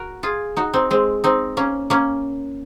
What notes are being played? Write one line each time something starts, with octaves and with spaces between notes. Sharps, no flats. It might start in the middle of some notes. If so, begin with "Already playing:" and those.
Already playing: F#4 A#4
F4 G#4
D#4 F#4
C4 D#4
G#3 C4
C4 D#4
A#3 C#4
A#3 C#4